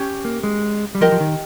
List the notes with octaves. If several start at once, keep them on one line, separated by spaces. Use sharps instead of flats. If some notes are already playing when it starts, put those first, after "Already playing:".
Already playing: C#4 G4 C#5
A#3
G#3
G3
F3 G4 A#4 D#5
F3
D#3